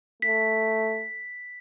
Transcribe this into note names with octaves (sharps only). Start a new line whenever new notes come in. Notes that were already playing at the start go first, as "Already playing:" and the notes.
A3 B6